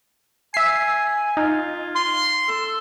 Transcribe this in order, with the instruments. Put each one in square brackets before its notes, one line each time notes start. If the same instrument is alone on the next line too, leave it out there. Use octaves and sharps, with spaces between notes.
[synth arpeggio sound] E5 C7 [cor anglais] G#5
[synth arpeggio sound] D#4 [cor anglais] F4
[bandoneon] C6
[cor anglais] A4